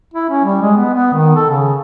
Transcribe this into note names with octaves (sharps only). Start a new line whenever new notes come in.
E4
C#4
G3
G#3
B3
B3
D#3
A4
C#3